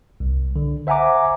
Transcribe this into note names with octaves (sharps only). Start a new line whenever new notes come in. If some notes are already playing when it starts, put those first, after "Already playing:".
C2
D3
C5 E5 F#5 G#5 A#5 D6